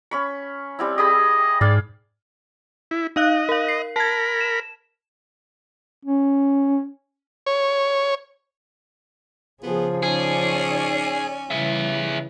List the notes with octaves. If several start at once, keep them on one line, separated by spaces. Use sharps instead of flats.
C#4 B5 C#6
G3 C4 E4
G4 G#4 D#5 B5
G#2 G#4 D5 F5 G5
E4
D#4 D#5 F5 F#6
A#4 F5
C7
A#4 A5 B5 G#6
E7
C#4
C#5
C#3 F3 B3 G#4
C#4 D#4 G#4 C#5 D5
C#3 E3 G3 G#4 E5